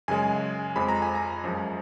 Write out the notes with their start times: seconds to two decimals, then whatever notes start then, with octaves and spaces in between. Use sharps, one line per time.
0.08 F#2 C#3 G#3 G#5
0.76 F2 F3 G#3 B5
0.89 A#5
1.02 G#5
1.15 A#5
1.44 F#2 F3 G#3